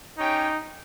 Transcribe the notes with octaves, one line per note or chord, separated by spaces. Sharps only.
C#4 D#4 G4 C#5 G5